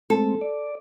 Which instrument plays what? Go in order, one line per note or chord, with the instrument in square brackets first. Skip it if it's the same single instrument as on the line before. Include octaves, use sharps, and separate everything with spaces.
[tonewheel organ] G#3 A3 C4 [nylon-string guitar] A4
[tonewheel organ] D5